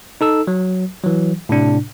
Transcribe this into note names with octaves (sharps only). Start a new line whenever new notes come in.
D#4 A4 E6
F#3
E3 F#3
A2 C3 D4